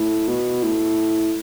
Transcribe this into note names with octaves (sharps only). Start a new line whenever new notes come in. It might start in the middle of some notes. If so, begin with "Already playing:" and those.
Already playing: A2
B2
A2